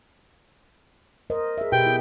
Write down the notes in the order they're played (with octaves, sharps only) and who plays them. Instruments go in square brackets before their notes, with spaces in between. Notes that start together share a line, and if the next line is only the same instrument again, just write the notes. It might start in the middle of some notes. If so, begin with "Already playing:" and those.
[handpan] A#4 C5 D#5
G#4 E5
[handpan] B2 G4 B4 [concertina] G5
[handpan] E4